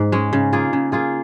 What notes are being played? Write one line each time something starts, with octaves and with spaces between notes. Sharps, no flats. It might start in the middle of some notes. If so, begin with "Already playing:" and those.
Already playing: G#2
G#3 C#4
C#3
A#3 F4 G#4
C#3
A#3 F4 G#4